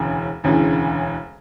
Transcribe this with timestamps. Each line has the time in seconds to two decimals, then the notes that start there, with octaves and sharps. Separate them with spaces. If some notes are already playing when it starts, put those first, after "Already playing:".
Already playing: E1 D2 C#3 E3
0.44 E1 D2 C#3 E3